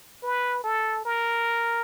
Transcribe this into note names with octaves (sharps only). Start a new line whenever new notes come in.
B4
A4
A#4